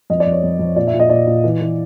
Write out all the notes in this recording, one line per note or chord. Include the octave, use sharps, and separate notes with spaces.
F2 D#5
D5
F2
C#5
F2
F2
A#2 D5
E5
A#2
D#5
A#2 D5
A#2
E3
E3